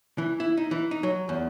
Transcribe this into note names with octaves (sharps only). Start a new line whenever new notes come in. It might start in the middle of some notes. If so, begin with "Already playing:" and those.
E3
E4
D#4
E3
D#4
F#3
E2